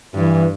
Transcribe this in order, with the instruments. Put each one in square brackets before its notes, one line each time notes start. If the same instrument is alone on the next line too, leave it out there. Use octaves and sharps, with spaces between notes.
[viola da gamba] G2 [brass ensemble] E3